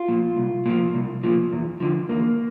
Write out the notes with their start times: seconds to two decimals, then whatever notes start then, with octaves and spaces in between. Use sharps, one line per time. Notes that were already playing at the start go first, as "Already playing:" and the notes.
Already playing: F4
0.08 A#2 F3
0.37 C2
0.66 A#2 F3
0.94 C2
1.24 A#2 F3
1.52 E2
1.80 D3 F3
2.09 E2 A#3